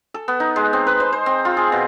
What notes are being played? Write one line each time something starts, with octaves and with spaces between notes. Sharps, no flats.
A4
B3
D#4
G#3
C4
B4
C5
C5
C4
F4
G#4
B2